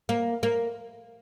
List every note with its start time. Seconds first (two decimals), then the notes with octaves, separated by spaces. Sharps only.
0.09 A#3
0.43 A#3